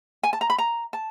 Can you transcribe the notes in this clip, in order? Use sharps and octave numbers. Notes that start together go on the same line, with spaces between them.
G#5
A5
A#5
B5
A#5
A5